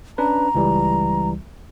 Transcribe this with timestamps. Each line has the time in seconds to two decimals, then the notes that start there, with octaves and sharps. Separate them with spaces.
0.18 C#4 D4 B4 A#5
0.55 C#2 E3 G3